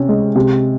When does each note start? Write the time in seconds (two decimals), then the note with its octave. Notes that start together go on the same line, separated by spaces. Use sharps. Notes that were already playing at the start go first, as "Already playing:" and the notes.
Already playing: C3 C#4
0.08 G#3
0.36 C3